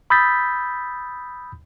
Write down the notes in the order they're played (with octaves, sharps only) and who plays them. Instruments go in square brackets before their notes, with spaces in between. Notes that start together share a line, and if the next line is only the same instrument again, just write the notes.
[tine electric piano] B5 D#6 E6 G6 A6 B6